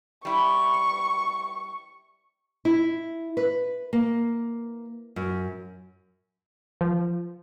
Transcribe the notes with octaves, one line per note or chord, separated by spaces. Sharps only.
G3 E4 C#6
E4
B4
A#3
F#2
F3